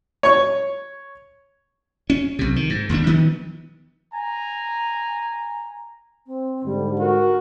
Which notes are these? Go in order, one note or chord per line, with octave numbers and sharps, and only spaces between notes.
C#5 C#6
C#4
B1 C3
D#3
G#2
E1 D#2 G#2 D4
D#3 F3 B3
G#5 A#5
C4
G#2 D3 G3
F#4 A#4